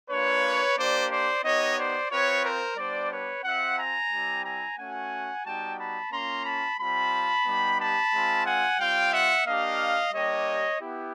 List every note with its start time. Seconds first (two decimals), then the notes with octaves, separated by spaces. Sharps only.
0.10 A#3 D4 F4 B4 C#5
0.77 A#3 D4 G4 C5 D5
1.10 C5 D5
1.43 B3 D#4 G4 C#5 D#5
1.77 C5 D5
2.11 C4 F4 B4 C#5
2.45 A#4 C5
2.77 G3 B3 D4 C5 D5
3.12 B4 C#5
3.44 C4 F4 E5 F#5
3.78 G#5 A#5
4.11 G3 C4 E4 G4
4.44 G#5 A#5
4.79 A3 C#4 F#4 F#5 G#5
5.45 G3 B3 D#4 F#4 G5 A5
5.79 A5 B5
6.12 A#3 C#4 F4 A#5 C6
6.45 A5 B5
6.78 G3 C4 F4 A5 B5
7.45 G3 B3 D#4 G4
7.79 A5 B5
8.13 G#3 C4 F4
8.46 F#5 G#5
8.79 G3 C4 F4 F5 G5
9.13 E5 F#5
9.46 A#3 D4 G4 D#5 F5
10.13 G3 A#3 D4 G4 C#5 D#5
10.80 B3 E4 G4